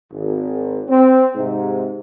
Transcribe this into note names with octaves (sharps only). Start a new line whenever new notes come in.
G#1
C4
G#2 C3